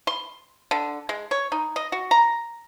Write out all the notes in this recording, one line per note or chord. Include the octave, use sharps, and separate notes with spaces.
C6
D3
G#3
C#5
D#4
D#5
F#4
A#5